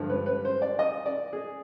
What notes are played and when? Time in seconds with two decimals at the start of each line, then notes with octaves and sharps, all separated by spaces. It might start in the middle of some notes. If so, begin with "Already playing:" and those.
Already playing: G2 D3 F3 G#3
0.09 B4
0.26 B4
0.45 C5
0.62 D5
0.79 D#5
1.06 D5
1.33 G#4